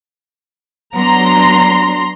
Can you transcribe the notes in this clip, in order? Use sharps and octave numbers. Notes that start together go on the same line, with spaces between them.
F#3 B3 D4 A#5 C6